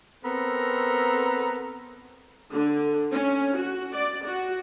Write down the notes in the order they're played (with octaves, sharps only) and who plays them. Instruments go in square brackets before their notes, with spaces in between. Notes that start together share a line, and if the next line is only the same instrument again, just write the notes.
[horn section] B3 C4 A4 A#4 A#5
[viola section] D3
C#4
F#4
D5
F#4